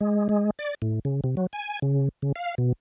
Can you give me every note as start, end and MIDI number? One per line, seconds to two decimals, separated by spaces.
0.01 0.29 56
0.29 0.50 56
0.59 0.74 74
0.82 0.99 45
1.05 1.21 49
1.24 1.35 48
1.37 1.47 54
1.53 1.79 80
1.82 2.09 49
2.22 2.32 49
2.36 2.55 77
2.58 2.72 47